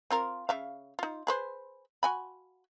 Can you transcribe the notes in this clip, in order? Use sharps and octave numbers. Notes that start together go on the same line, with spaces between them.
C4 F4 A#4
C#3 E5 F5
D#4 F4
G#4 B4 C5
F#4 G#5 B5